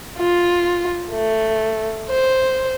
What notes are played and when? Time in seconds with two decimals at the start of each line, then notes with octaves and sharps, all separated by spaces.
0.18 F4
1.11 A3
2.10 C5